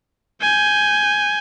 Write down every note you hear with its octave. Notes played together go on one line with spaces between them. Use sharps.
G#5 G6